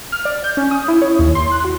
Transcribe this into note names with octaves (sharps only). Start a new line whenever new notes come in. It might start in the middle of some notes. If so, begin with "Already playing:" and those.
F6
D5
G6
C#4
D#6
E4
C#5
D#2
C6
F#6
F#4